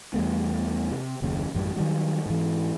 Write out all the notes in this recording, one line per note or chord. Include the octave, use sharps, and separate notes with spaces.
E2 G3 A3 B3
C3
F#1 D#2 C#3
A1 F#2 F#3 G3
D#3 F#3 G3
G#2 E3